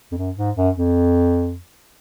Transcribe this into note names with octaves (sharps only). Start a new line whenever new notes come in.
F2
F#2
G#2
F#2
F2